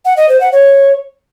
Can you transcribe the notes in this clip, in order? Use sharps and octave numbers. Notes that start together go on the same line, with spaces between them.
F#5
D#5
C5
F#5
C#5